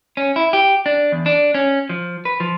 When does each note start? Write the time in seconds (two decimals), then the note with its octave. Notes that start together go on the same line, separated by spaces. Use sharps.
0.17 C#4
0.36 E4
0.53 G4
0.86 D4
1.12 E2
1.26 D4
1.54 C#4
1.89 F3
2.25 B4
2.40 F3